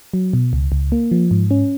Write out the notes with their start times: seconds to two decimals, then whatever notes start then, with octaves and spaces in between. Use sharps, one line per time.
0.13 F#3
0.33 B2
0.53 C#2
0.72 C#2
0.92 A#3
1.11 F3
1.31 G#2
1.51 C#4